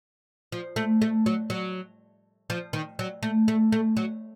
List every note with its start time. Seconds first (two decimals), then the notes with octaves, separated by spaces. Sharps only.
0.52 F3
0.76 A3
1.02 A3
1.26 F#3
1.50 F#3
2.50 F3
2.73 D#3
2.99 F#3
3.23 A3
3.48 A3
3.72 A3
3.97 F#3